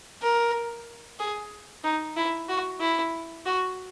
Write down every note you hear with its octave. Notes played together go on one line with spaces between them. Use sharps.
A#4
G#4
D#4
E4
F#4
E4
F#4